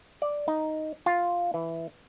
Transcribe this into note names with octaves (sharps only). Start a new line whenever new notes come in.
D5
D#4
F4
E3